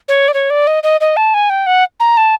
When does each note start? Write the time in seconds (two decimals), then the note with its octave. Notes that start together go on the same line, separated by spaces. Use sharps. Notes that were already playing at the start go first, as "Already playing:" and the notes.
0.08 C#5
0.28 D5
0.34 C#5
0.50 D5
0.67 D#5
0.83 D#5
1.01 D#5
1.17 A5
1.34 G#5
1.50 G5
1.66 F#5
2.00 A#5
2.17 A5